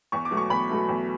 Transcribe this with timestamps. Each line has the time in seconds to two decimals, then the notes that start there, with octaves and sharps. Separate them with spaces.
0.12 E2 C#6
0.25 D6
0.31 B2 F#3 A3
0.37 C#6
0.50 E2 B5
0.69 B2 F#3 A3
0.89 E2